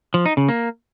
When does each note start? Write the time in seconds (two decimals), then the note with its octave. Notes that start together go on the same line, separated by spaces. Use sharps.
0.14 F3
0.26 D#4
0.37 C#3
0.49 A#3